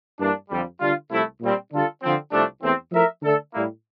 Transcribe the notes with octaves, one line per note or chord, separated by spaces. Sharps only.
G2 E3 A#3 D4
F2 D3 G3
D3 G3 D4 F4
C2 C3 F3 A3 E4
A#2 G3 C4
D3 G3 D4 F4 A4
D3 F3 C4
C2 C3 F3 A3 D4
E2 E3 A3 C4
F3 A3 E4 A#4 E5
D3 A3 D4 A4
A2 G3 A#3 E4